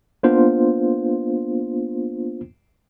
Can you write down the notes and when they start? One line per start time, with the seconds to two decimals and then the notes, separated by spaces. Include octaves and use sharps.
0.23 A#3 B3 D4 F4 C5